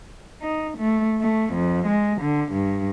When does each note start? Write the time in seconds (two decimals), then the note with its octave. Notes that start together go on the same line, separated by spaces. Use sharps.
0.42 D#4
0.78 A3
1.21 A3
1.53 F2
1.86 G#3
2.21 D3
2.52 G2